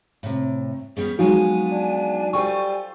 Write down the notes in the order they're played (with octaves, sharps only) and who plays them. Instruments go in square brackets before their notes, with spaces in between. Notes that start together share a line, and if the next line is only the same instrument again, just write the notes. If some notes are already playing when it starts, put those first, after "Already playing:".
[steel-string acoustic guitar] A2 C3
[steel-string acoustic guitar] G3 B3 C#4 [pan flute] G#4
[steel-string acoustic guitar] F3 G#3 B3 [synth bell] F#3 D#4 F#4 [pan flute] G#5
[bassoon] D4
[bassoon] G3 [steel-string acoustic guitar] F4 A4 C5 [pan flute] G#5 [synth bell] C#6